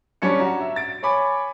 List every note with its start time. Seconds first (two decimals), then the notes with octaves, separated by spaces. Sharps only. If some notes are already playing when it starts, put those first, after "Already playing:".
0.22 G3 C#4 D4 C#7
0.39 F#4 A#5
0.60 E5
0.76 A6 D7
1.03 C#5 G#5 B5 D6